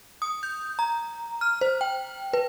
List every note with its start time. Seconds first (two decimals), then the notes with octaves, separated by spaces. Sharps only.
0.22 D#6
0.43 G6
0.79 A#5
1.41 F6
1.61 C5
1.81 G5
2.33 B4